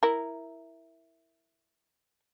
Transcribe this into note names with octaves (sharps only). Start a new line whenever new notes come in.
E4 A#4